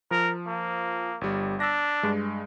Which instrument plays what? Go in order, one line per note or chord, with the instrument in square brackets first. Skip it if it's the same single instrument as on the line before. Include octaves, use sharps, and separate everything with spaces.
[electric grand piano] F3 [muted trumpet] A#4
[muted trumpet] A#3
[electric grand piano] G1 G3
[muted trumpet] D4 [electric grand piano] E6 A#6
[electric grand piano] G2 G#3